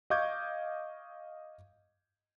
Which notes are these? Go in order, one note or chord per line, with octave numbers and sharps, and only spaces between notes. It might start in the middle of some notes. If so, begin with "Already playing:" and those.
D#5 F5 C#6 D6 G6 G#6